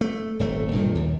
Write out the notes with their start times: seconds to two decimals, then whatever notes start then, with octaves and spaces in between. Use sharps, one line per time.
0.01 A3
0.39 D#1 G#1 A3
0.72 B1 G2 A#2 D#3
0.95 D#2